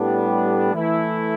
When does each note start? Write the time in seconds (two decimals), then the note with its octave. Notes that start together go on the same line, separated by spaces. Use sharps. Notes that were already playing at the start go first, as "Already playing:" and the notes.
Already playing: A2 G3 B3 D4
0.73 E3 A3 E4